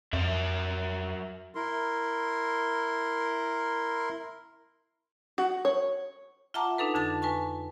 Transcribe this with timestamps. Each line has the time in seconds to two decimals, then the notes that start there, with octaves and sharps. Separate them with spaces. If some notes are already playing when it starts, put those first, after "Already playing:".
0.13 F2 F#3 A#4 E5
1.54 E4 A#4 C6
5.38 F#4
5.65 C#5
6.54 F4 E5 F#5 A5 A#5 D6
6.78 D4 D#4 A4 B4
6.94 F2 D3 D4 A5 A6
7.22 B4 G#5 A5 C#6